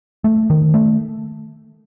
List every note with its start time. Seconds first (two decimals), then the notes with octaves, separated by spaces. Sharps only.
0.24 A3
0.50 D#3
0.74 A3